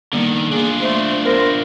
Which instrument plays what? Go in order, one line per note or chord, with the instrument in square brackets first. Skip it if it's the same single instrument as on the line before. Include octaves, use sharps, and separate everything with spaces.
[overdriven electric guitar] D3 D#3 [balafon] G3 A#3 B3
[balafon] A#3 [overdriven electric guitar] D4 F4 [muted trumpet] G#4
[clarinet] A3 [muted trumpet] C5
[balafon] B3 [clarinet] A#4 [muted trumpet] C5